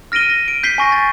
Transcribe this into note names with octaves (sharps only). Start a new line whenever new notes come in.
F6 A#6 D7 D#7 G7
A#6
D7
G6 B6 C7 G7
G#5 C#6 A#6
A6